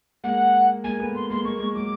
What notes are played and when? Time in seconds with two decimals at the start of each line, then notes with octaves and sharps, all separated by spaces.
0.24 G#3 A#3 F#5
0.84 G#3 A#3 G#5
0.99 A3 B3
1.15 C6
1.29 G#3 A#3 C6
1.44 G#3 A#3 C#6
1.59 G#3 A#3
1.74 F#3 G#3 D6